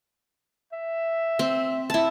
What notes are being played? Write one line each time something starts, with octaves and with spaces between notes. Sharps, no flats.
E5
C4
E4 A5